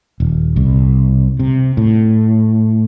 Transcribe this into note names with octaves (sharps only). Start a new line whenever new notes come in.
D#1
C2
C3
A2